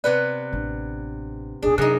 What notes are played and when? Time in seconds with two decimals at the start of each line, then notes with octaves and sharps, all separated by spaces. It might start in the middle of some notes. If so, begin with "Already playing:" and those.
0.04 C3 B3 B4 D5 F#6
0.53 A1 D4
1.62 C2 B2 D4 G#4
1.78 F#2 C3 D#4 G#4 F#6